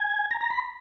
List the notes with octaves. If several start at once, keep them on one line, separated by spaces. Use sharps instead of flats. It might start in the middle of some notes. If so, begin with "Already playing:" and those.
Already playing: G#5
A#5
A#5
B5